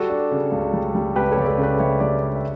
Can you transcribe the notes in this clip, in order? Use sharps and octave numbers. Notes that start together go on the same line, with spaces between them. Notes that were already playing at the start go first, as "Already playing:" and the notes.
Already playing: G3 F#4 A4
D4
C#3
C#2
G3
G3
C#2 G4 B4
A4 C#5
C#2 D5
A4 C#5
C#3
B4 D5
G3 C#5 E5
G3 B4 D5
D4 D5
E5